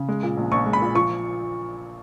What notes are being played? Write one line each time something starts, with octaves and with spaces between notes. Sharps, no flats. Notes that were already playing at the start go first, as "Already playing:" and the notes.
Already playing: C#3
G#3
A#2
A#1
A#1 C#6
G#3
B5
A#2
F3 C#6